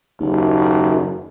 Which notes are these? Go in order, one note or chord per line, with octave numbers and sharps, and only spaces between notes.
F#1 D#2